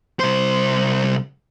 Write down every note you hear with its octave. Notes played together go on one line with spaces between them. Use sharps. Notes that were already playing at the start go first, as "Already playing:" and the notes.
C2 C5